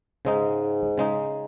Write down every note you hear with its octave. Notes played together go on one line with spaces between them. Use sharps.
G#2 C#3 G#3 D#4
C#3 G#3 D#4